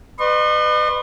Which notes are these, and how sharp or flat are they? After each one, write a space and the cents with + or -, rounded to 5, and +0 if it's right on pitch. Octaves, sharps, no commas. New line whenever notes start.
B4 +20 D#5 -45 C6 +45